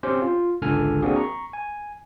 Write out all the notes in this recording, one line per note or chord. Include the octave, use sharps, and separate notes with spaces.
C4 C#4 G4 C5
F4
G#1 C#2 D3 A4 G#5 F6
A#3 C4 D4 F#4 G#4
A#5 C#6
G#5